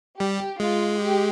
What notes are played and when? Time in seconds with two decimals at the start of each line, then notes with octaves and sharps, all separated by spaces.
0.20 G3 G4
0.60 G#3 F4
1.00 G4